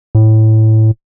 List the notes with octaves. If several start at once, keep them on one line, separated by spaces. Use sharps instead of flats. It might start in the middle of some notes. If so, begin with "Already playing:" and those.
A2